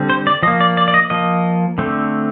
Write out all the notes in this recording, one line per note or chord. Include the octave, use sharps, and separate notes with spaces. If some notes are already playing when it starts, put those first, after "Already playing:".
Already playing: D3 G3 C4
C5
D5
F3 A#3 D#5
D5
D5
D5
D#5
F3 A#3 D#5
D3 A3 C4